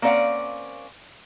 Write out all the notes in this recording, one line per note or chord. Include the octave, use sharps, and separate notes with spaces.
A#3 C4 C#4 D5 F5 F#5